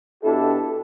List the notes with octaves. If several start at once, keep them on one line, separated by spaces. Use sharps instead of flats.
B2 D4 E4 G4 A4